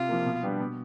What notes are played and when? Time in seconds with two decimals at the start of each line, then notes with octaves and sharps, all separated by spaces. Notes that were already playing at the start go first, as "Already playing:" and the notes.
Already playing: C3 F4
0.09 F3 A#3
0.25 B2
0.43 G3 B3 D4
0.59 B2